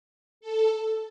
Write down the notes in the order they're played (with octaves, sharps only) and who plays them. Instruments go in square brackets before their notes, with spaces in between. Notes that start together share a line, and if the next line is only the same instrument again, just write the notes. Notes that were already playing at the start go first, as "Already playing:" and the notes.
[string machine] A4